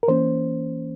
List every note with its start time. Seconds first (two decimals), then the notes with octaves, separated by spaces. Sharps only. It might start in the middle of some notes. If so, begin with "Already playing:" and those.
0.03 A#4
0.08 E3 A#3 C#4 C5